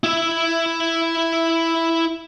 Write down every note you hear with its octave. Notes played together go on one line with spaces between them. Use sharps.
E4 E5